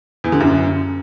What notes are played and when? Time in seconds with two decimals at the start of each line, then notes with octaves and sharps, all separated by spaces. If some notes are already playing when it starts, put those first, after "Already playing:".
0.24 E2
0.32 D3
0.40 F#2